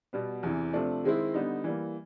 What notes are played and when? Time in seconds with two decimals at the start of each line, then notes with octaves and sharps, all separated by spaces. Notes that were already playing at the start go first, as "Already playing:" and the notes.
0.13 B2 G3 B3
0.43 E2 C3 E3
0.73 C3 F3 A3 D4
1.04 D#3 G#3 C4 E4
1.34 D3 G3 B3 D#4
1.64 E3 G3 A#3